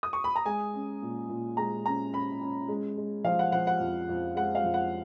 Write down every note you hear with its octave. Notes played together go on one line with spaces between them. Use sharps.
D#6
C#6
B5
A#5
G#3 G#5
C#4
A#2
A#2
G#3 A#5
C#4 A#5
C#4 B5
C#4
G#3
G#3
F3 F5
F#5
F3 F#5
F#5
F2
F2
G#3 F#5
F5
F2
F#5